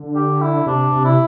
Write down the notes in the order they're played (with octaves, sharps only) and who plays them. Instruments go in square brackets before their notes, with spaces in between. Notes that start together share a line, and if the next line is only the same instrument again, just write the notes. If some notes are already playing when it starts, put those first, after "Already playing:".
Already playing: [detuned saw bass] D3
[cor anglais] G4
E4
[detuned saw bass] C3 [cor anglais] D4
[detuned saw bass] C3
[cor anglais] E4